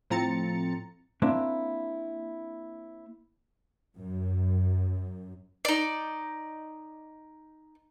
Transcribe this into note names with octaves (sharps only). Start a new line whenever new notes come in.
A2 F3 C4 A#5 A6 C#7
A#3 C4 D4 E4
F#2
D#4 D5